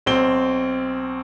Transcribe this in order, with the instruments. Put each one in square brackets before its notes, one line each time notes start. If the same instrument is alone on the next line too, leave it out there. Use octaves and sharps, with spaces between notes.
[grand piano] B1 C4 G7